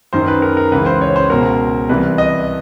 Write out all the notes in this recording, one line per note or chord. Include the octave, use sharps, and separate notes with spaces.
F#2 D#3 C5
B4
A#4
A#4
C#2 C#3 E3 B4
C5
C#5
C5
C#2 B2 A#4
C2 C3 E3 B4
D#5